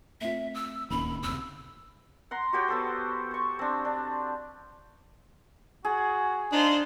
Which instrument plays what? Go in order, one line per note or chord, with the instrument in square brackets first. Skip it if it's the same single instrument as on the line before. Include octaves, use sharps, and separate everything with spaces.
[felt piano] A3 C4 F4 [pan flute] E5
[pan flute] E6
[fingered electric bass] D1 C#4 [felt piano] D#2 [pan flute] B5
[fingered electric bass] F#1 D2 C3 [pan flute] E6
[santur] F#5 A#5 C6
F#4 G4 C#5 G5
B3 A4 C5
C5 C#6
C4 D4
D4
[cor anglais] F#4 [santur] G#4
[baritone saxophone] D4 [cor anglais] D#4 [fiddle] F4 C5